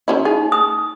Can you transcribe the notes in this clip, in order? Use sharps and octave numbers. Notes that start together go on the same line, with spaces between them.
D#3 C#4 E4
D#4 G#4
D#6